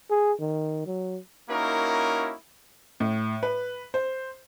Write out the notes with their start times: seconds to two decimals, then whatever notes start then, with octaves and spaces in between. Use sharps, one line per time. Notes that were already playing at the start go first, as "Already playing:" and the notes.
0.10 G#4
0.40 D#3
0.86 F#3
1.49 A#3 C#4 D#4 E4 F#4 A#4
3.00 A2
3.43 B4
3.94 C5